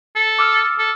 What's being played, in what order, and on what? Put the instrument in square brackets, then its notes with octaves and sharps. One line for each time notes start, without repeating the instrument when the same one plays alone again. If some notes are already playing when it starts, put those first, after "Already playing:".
[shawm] A4
[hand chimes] D6 E6 F6
[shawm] A4